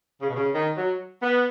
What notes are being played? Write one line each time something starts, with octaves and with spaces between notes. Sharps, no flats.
C#3
B2
C#3
D#3
F#3
B3